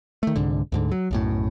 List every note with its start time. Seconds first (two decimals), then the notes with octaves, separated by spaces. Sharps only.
0.23 D#3 A3
0.36 C2 G#2 D3
0.72 D2 G#2 D3
0.91 F#3
1.11 B1 F#2 A2